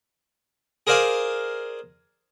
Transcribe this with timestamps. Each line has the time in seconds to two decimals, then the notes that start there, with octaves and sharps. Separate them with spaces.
0.87 G#4 A#4 C5 D5 F5 G#5